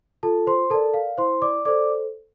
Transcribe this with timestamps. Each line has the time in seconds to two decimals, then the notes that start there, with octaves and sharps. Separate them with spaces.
0.23 F4 A4 A5
0.47 C5 C6
0.70 A4 A#4 D5 A5
0.94 F5
1.18 E4 C5 C6
1.42 D5 D6
1.65 A4 C5 D5 D6